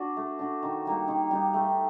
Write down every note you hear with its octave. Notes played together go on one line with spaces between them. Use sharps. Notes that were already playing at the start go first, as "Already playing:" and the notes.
Already playing: D4 F#4
A3
D4 F#4
D#3
G3 A#3 D#4
D#3
G3 A#3 D#4
A3